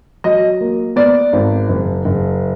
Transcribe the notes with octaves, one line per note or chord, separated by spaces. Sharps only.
F#3 D#5
A#3
B3 D5
G#1
F#1
F#1